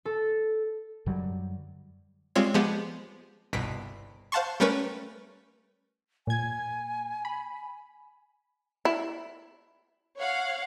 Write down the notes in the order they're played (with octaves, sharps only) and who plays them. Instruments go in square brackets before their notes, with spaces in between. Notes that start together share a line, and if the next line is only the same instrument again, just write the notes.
[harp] A4
[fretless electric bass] F#2 D3 F#3 G3
[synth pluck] G3 G#3 C4 F4 C#5
F3 G#3 B3 G4 G#4
G1 C2 B2 B6 D7
C5 F5 F#5 A5 C6 C#6
G3 A3 C#4 A#4 B4 C#5
[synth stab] A#2 G#6 [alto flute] G#5
[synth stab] B5
[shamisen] E4
[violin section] C#5 F5 F#5